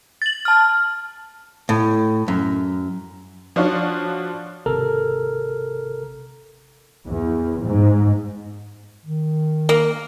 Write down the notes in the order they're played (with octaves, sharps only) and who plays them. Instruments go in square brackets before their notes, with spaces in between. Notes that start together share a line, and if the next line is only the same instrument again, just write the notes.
[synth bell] A6 F#7
A5 F6
[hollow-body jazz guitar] A2
F#2
[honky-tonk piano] F3 D4 F4 F#4 C#5
[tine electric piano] G#1 C3 A4 A#4 F6
[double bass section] E2
G#2
[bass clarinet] D#3
[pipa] A#3